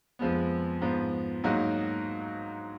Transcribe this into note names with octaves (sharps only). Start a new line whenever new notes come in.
F2 F3 G#3 B3
G#2 F3 B3
G#2 F#3 A#3 D#4 F#4